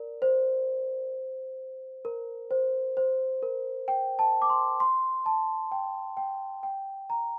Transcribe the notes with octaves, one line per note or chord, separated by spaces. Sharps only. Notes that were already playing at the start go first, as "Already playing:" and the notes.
Already playing: A#4 D5
C5
A#4
C5
C5
A#4
G5
A5
D6
C6
C6
A5
G5
G5
G5
A#5